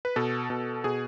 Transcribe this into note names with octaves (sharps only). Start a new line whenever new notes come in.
B4
B2 A4
B2
B2 G#4